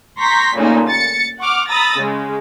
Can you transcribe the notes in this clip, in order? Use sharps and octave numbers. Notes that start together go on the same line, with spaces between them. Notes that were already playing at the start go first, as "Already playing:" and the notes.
A#5 C6 C#6 G6 A#6 B6
A#2 C#3 G3 A3 A#3 D#4
A6 C#7
F#5 C#6 D6 F6
A#5 B5 D#6 E6 A6 A#6
C#3 G#3